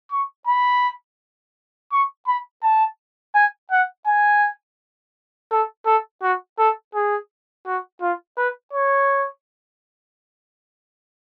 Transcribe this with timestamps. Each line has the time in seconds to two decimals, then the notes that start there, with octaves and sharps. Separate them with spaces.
0.11 C#6
0.47 B5
1.91 C#6
2.27 B5
2.63 A5
3.35 G#5
3.71 F#5
4.06 G#5
5.51 A4
5.86 A4
6.22 F#4
6.58 A4
6.94 G#4
7.66 F#4
8.01 F4
8.37 B4
8.73 C#5